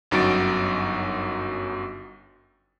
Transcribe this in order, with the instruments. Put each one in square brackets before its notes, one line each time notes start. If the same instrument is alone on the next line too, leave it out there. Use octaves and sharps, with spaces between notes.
[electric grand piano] G1 F#2 D#4 F#4 A6 D7